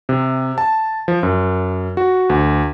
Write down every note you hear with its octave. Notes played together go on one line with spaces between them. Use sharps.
C3
A5
F3
F#2
F#4
D2